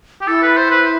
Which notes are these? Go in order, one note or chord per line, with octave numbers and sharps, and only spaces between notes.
G4
E4 A4
B4
C5
B4